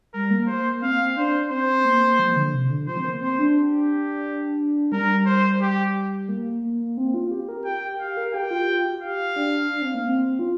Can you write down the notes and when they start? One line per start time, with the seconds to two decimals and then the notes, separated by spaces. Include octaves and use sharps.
0.14 G3 A#4
0.31 A#3
0.48 C5
0.65 A#3
0.82 C4 F5
1.17 D4 C5
1.51 C4 C5
1.85 A#3
2.19 F3
2.36 D3
2.54 C3
2.70 D3
2.87 F3 C5
2.97 C4
3.04 A#3
3.21 C4 C5
3.39 D4
3.56 G4
4.92 G3 A#4
5.26 C5
5.61 G4
6.29 A#3
6.63 A#3
6.97 C4
7.14 F4
7.31 G4
7.49 A#4
7.65 G5
7.82 G4
8.00 G4 F5
8.17 A#4
8.34 G4 G5
8.51 F4
8.68 F4
8.85 G4
9.02 G4 F5
9.36 D4
9.71 D4
9.82 C4
9.94 A#3
10.07 C4
10.39 F4